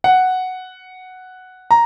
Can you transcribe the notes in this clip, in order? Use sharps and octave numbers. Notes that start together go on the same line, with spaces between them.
F#5
A#5